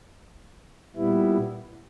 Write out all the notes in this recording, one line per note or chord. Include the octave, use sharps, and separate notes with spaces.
A#2 G3 B3 E4